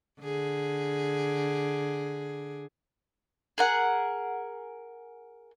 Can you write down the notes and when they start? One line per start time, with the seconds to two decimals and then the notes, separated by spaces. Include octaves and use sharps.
0.21 D3 G#4
3.58 G#4 A#4 F#5